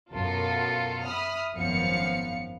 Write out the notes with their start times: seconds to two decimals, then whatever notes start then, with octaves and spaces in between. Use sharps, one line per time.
0.11 F#2 B2 F4 A4 A#4
1.04 E5 B5 D#6 F6
1.54 G#1 F#2 F3 B3 F5 C#7